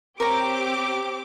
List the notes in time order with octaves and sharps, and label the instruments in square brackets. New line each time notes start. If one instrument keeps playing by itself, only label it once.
[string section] C4 G4 D6 [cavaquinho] A#4 C#5 A#5